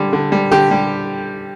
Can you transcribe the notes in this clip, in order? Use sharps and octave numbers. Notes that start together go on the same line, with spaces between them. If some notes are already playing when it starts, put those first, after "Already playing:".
Already playing: D3 G3
D3
G3
D3 G4
G3